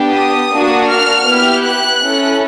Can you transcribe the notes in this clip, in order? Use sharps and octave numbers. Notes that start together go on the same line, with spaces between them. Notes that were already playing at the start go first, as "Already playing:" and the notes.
Already playing: B3 D4 G4
D#6
A#3 D4 F#4
F6
B3 E4 G4
F#6
C#4 E4 A4